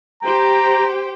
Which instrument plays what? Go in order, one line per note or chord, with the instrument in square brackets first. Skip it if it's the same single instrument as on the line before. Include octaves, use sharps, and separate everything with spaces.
[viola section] G4 C5 G5 [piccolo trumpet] A#5